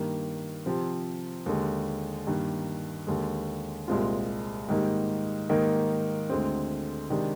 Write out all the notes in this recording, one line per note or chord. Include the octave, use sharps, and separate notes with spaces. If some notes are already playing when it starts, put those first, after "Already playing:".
Already playing: G2 D#3 A#3
C3 F3 C4
D#2 D3 G#3
G2 D#3 A#3
D#2 D3 G#3
C2 A#2 G#3 C4 F4
G#2 D#3 G3 A#3 D#4
G#2 D#3 G3 A#3 D#4
D2 D3 G#3 C4
C3 D#3 G#3 D4